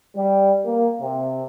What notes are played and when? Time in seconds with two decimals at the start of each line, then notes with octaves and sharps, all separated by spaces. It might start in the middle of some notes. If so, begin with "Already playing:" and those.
0.17 G3
0.65 A#3
1.02 C3